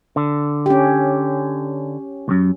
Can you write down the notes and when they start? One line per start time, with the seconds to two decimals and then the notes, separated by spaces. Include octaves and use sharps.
0.16 D3
0.66 C#4 G4
2.28 C#2 F#2